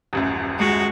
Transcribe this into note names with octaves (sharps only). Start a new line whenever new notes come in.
D#1 A1 F#2
G#3 F#4